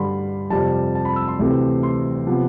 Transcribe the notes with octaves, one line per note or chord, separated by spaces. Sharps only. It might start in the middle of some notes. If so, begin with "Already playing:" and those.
Already playing: G2 D3 G3 B5 C6
F2 C3 G3 C4 A5
A5
B5
E6
C6
D2 C3 E3 A3 C4
C6
C3 F3 B3